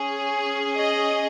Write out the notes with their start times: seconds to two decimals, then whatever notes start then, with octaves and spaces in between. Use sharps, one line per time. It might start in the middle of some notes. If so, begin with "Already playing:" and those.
Already playing: C#4 G#4
0.77 D#5